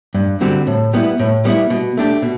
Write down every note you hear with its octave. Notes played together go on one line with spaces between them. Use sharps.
G2
D3 G3 C4 F#4
A2
G3 B3 E4
A2
G3 B3 E4
B2
A3 D4 G4
B2